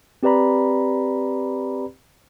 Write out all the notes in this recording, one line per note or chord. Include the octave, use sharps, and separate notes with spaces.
C4 G4 B4 D5 A#5 B5